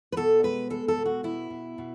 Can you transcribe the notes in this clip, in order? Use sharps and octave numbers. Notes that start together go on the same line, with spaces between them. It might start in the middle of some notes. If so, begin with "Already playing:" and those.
B4
B2 A4
G#3 B4
G#3 A4
A4
B2
F#4
B2 E4
B2
B2